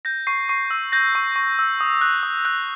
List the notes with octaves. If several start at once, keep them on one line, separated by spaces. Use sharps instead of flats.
G6 A#6
C#6 C7
C#6 C7
E6
G6 A#6
C#6
C#6
E6
D#6
F#6
D#6
F#6